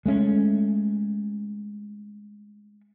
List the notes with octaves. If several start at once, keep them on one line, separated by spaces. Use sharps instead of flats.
G#3 A3 C#4